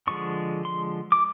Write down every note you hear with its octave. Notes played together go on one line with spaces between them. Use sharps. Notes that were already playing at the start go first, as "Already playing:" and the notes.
D3 F3 G#3 C#6
C6
D6